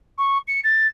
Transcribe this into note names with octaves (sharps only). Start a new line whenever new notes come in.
C#6
C#7
A6